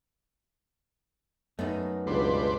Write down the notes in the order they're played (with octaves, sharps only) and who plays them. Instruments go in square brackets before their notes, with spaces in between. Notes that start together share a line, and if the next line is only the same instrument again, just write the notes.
[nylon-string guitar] F#2 [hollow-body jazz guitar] A3 B3 D#4
[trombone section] C#2 G2 B2 [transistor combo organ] D4 B4 C5